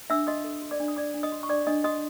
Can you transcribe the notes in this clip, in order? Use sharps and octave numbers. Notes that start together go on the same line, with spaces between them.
D4 E5 E6
F#4 D#5 D#6
A4
F#4
D5 D6
D4
D#6
D4 D5 D6
D4
D#5 D#6
F#4
C#6
D4 D5 D6
D4 D#5 D#6
F#4 D#5 D#6